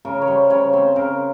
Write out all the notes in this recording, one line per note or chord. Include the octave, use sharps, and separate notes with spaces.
C#3 A#4
C#5
G3 C5
C#3 C#5
C4 C5
C#3 A#4